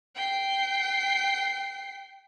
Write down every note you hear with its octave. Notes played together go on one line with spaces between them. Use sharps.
G5 C7